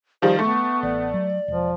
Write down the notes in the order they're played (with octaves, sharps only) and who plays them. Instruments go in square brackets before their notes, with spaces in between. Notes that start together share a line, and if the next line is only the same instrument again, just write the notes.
[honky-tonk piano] D#3 F3 G3 [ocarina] C5
[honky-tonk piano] A3 [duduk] B3 [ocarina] C#6
[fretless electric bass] A1 [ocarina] D5
[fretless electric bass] F#3
[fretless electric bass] E1 [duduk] F3